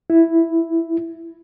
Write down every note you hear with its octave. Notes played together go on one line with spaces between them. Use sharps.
E4